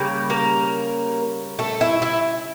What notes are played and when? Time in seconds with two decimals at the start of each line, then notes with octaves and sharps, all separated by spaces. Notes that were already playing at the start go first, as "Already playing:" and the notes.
Already playing: C#3 G3 A#3
0.30 A#3 A#4
1.59 A3 A4
1.81 E4 E5
2.02 E4 E5